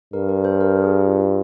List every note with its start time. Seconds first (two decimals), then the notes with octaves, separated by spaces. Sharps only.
0.13 G2 A#4
0.29 A#4
0.45 C5
0.61 A#4
0.84 G#4
1.08 F4